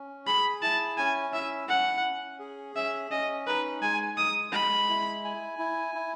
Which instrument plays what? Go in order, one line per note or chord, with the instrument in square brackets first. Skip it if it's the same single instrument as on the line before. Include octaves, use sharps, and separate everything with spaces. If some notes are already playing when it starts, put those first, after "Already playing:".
Already playing: [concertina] C#4
[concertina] G#4 [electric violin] B5
[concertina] E4 [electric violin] A5
[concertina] C#4 [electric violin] G#5
[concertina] E4 [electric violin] E5
[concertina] C#4 [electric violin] F#5
[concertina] C#4
G#4
[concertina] C#4 [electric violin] E5
[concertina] C#4 [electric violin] D#5
[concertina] D#4 [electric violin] B4
[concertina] G#3 [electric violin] G#5
[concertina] G#3 [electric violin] D#6
[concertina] G#3 [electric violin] B5
[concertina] E4
G#5
E4
E4